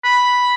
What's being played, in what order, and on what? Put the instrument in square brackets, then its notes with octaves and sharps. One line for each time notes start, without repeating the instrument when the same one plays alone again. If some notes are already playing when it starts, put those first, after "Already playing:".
[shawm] B5